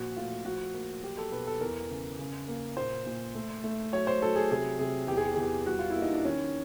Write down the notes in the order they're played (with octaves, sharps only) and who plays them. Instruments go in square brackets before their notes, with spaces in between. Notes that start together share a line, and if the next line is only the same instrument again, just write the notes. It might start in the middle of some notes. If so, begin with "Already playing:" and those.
Already playing: [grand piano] A#2 F3 F#4
A3 F4
F3 F#4
A#3
F#3 G4
A4
B2 B4
A4
E2 A#4
C#3
C#3
A#3
A#2 C5
A#2
A3
A3
F#3 C#5
C5
F#3 A4
G#4
C3 G#4
C3 G#4
E2 G4
G#4
G4
E2 G#4
G4
G3 F#4
F4
E4
A#3
D#4
D4
D#3 C#4